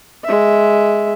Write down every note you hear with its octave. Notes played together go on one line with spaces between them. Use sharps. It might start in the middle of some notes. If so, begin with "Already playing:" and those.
G#3 E5